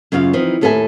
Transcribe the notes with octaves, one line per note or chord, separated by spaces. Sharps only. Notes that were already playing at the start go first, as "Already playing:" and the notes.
F#2 C#3 B3 F4 F5
E3 F3 C4 D#4
D#2 A2 A4 B4 E5 G#5